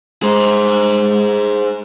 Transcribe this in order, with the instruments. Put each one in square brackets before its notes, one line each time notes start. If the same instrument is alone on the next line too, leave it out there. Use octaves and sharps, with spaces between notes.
[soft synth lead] G#3 [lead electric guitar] G#4 C5